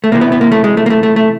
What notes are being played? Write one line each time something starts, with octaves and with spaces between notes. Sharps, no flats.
A3
C3 E3 A#3
B3
B3
A#3
A3
G#3
A3
A#3
A3
A3
A3